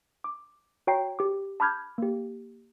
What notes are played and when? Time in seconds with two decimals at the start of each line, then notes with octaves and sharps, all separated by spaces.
0.24 D6
0.87 F#4 C#5 G5 A#5 C7
1.19 G4 D6
1.60 A5 B5 D6 F6 G6 G#6
1.98 A#3 G4